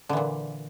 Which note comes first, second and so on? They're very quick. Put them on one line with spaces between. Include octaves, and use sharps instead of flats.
D3 E3 A#2